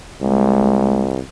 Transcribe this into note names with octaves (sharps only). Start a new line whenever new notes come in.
C2 G#3